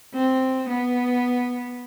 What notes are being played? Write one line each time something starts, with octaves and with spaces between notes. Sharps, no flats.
C4
B3